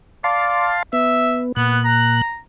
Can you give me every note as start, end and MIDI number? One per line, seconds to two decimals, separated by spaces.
0.24 0.71 74
0.24 0.83 77
0.24 0.83 81
0.24 0.83 84
0.93 1.52 59
0.93 1.41 76
1.56 2.22 46
1.56 1.80 59
1.56 2.22 90
1.85 2.39 82